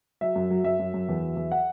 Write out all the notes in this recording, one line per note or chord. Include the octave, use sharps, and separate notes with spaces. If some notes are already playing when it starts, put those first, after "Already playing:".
F#3 E5
F#2
F#3
F#2 E5
F#2
F#2
E2
F#3
E2
F#5